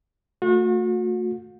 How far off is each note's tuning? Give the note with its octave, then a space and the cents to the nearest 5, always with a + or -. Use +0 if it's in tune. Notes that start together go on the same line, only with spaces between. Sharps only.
A3 +20 F#4 -40